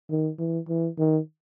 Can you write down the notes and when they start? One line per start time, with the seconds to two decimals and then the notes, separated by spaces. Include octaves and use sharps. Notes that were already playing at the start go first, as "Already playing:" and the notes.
0.10 D#3
0.39 E3
0.68 E3
0.98 D#3